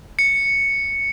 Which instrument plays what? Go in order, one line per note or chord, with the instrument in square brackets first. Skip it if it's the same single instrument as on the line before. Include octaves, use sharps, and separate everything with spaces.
[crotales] C#7